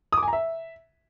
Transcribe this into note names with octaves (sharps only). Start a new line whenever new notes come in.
D#6
D6
G#5
A#5
E5